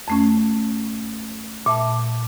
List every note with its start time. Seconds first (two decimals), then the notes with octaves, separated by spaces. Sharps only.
0.08 F2 A3 C#4
1.66 A#2 E5 A5